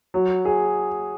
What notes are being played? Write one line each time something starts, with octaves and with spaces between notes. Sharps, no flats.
F#3
G#4